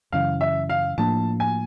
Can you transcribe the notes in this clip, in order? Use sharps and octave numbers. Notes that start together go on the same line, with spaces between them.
F#2 C#3 E3 F5
E5
F5
A2 F3 A#3 D4 A5
G#5